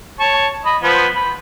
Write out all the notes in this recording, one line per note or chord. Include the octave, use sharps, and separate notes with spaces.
C#5 A5 C#6
D#5 B5
F3 B3 C5
B5